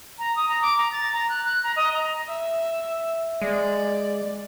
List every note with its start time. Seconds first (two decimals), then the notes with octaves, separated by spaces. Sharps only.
0.19 A#5
0.36 D#6
0.49 A#5
0.62 D6
0.77 A#5
0.92 A6
1.13 A#5
1.29 F#6
1.45 F#6
1.63 A#5
1.76 D#5
1.93 A#5
2.28 E5
3.42 G#3 D5